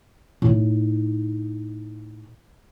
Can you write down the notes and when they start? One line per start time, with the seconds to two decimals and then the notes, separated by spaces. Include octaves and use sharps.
0.42 A2 D#4